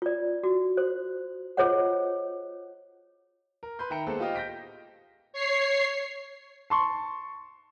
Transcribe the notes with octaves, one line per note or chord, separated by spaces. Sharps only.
F4 D5
F#4
C5
F4 G#4 C5 C#5 D#5 F#5
A#4
B4 B5 C6 G6
D#3 E5 G5 A#5 C#7
G#3 A#3 B3 A4 C5
F4 G4 C5 D#5 F5 G5
G6 A#6 B6 D7
C#5 C7
A5 C6 C#6